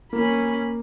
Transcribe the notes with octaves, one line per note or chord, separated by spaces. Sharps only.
A#3 C#4 B5